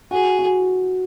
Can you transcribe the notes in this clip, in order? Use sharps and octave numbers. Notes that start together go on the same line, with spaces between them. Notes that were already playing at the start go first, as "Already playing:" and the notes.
F#4 G#4
F#4